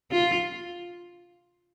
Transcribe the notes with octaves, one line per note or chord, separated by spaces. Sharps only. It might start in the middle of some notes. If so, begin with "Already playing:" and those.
F4